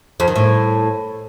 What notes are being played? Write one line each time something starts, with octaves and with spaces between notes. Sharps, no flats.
F2
D#3
A2